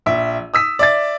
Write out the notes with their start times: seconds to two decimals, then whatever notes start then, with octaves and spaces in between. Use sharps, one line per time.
0.06 A#1 E5
0.54 D#6 E6 B6
0.79 D5 E5 A6